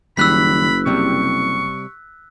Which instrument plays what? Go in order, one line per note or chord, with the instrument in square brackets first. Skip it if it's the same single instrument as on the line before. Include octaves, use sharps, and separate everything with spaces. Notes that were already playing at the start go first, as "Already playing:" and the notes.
[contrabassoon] F#1 [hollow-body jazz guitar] D#3 G3 [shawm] B5 [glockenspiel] E6 F#6 B6
[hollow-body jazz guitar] C3 G3 C4 [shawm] C#6